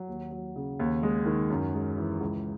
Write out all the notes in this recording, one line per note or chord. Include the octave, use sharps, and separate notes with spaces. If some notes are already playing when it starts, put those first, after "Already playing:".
Already playing: F#3
D#2
F#3
C#3
D#2
G#3
D#3
F#2
G#3
E3
C#2